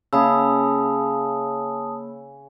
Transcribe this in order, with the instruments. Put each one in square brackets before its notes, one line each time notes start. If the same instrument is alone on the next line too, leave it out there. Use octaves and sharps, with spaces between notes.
[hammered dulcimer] C#3 [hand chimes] A#3 B5 E6 [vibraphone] A5 D#6